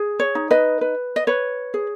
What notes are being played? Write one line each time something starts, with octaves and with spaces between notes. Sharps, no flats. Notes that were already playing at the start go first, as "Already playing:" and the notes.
Already playing: G#4
C#5
D#4
B4 D#5
B4
D#5
B4 C#5
G#4